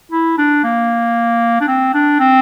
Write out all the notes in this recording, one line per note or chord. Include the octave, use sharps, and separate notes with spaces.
E4
D4
A#3
D4
C4
D4
C4